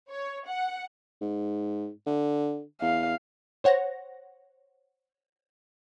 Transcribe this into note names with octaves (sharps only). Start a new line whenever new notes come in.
C#5
F#5
G#2
D3
E2 F5
C5 C#5 F#5 A#6